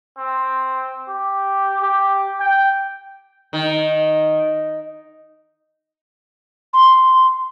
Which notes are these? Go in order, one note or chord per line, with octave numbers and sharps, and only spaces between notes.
C4
G4
G4
G5
D#3
C6